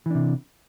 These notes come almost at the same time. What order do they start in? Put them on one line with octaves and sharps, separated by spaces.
E3 D4 C3